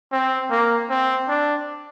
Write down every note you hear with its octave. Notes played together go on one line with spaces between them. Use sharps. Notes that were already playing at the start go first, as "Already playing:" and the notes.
C4
A#3
C4
D4